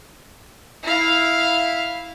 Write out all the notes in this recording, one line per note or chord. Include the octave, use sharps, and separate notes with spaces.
E4 F5